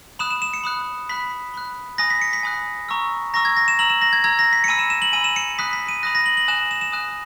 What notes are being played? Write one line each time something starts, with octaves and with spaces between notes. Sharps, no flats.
B5 D#6 F#6 E7
E7
E7
C#7
B5 D#6 F#6
B5 F#6 B6
B5 F#6
G#5 B5 D#6 F#6 A#6
B6
C#7
B6
G#5 B5 D#6 F#6
A#5 C#6 E6
A#5 C#6 E6 A#6
G#6
A#6
E7
A#5 E6 F#7
E7
A#6
G#6
A#5 E6 G#6
A#6
B6
C#7
G#5 B5 E6 D#7
E7
E7
F#7
G#5 B5 E6 D#7
E7
C#7
B5 D#6 F#6 B6
B6
D#7
B5 D#6 F#6 A#6
A#6
F#7
F#7
G#5 D#6 F#6 E7
E7
E7
G#5 D#6 F#6